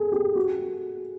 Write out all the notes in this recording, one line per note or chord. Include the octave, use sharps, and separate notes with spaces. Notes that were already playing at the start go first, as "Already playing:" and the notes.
Already playing: G#4 A4
G4
F#4